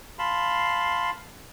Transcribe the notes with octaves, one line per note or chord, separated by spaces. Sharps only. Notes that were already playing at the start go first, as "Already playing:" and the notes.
F5 A5 B5 C6